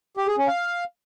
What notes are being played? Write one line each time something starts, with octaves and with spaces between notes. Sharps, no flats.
G4
G#4
C#4
F5